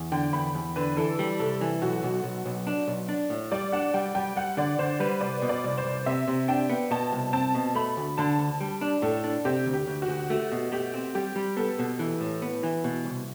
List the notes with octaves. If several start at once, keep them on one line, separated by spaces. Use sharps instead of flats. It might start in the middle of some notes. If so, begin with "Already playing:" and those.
Already playing: E2
D3 G5
E2 B5
E2
D3 B4
E3 A4
G3
C2 A4
E3
B1 F#4
B1
B1
B1
D4
B1
D4
A2
G3 D5
D4 F#5
G3 G5
G3 G5
G3 F#5
D3 D5
D3 C5
G3 B4
C2 D5
B2
D5
C2
C5
C2
C3 E5
C3
D4 G5
B3
B2 A5
C2
C4 A5
B2
A3 B5
D2
D3 A5
D2
G3
D4
A2 A4
D4
C3 G4
D2
G4
D2
F#4
D2
A3 F#4
B2
A3 G4
C4
G3 G4
G3
B3 A4
B2
E3
A2
B3
E3
B2
C2